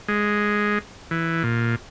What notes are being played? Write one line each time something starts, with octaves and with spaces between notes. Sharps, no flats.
G#3
E3
A#2